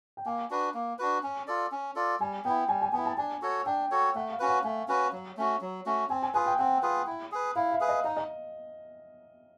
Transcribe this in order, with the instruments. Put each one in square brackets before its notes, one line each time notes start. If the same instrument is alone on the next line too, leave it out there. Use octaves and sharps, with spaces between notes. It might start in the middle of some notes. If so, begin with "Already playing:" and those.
[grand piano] G5
[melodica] A#3 [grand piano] G#5
[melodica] D4 F#4 B4
A#3
D4 F#4 B4
C#4
F4 A4 D5
C#4
F4 A4 D5
[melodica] G3 [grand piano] G#5
[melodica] B3 [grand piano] G5
[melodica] E4
[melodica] G3 [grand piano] G#5
[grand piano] G#5
[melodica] B3 [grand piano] G#5
[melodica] E4
[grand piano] A5
[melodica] D4 [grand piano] G#5
[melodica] F#4 A4 C#5
[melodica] D4 [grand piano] G5
[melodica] F#4 A4 C#5
[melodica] A3 [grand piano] F#5
[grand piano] F5
[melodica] C#4 F#4 B4
[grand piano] F#5
[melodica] A3 [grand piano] G#5
[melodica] C#4 F#4 B4
F#3
A3 C#4 F#4
F#3
A3 C#4 F#4
[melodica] C4 [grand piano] G#5
[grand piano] G#5
[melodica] F4 G#4 B4 [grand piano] G#5
[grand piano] G5
[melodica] C4 [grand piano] F#5
[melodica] F4 G#4 B4
E4
G#4 B4
[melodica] E4 [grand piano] F5
[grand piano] E5
[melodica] G#4 B4
[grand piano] D#5
[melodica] D#4 [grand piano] D#5
[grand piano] D#5